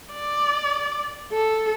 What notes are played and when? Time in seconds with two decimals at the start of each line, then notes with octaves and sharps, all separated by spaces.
0.12 D5
1.32 A4